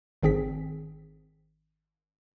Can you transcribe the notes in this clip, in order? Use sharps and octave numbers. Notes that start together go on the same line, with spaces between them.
G#1 D#3 C4 G#4 B6